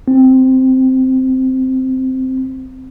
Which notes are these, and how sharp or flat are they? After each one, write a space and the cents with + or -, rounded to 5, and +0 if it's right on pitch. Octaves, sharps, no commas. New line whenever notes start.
C4 -5